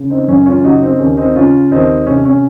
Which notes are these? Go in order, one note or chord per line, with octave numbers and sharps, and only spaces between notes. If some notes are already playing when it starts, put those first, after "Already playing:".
Already playing: C#3
C4 D#4
F#2 C#4
C#4 F4
C#3 D#4 F#4
C4 D#4
D#2 C#4
C4 D#4
C#3 C#4 F4
D#2 C4 D#4
C3 C#4
C#4